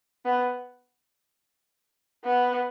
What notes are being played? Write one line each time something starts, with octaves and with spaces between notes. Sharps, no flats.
B3
B3